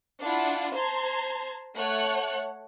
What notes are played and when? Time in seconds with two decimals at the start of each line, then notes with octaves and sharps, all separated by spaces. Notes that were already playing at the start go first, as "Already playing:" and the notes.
0.21 D4 E4 F4 F#5
0.73 C5 A5 A#5 C6 G#6
1.76 A3 C#5 F#5 F#6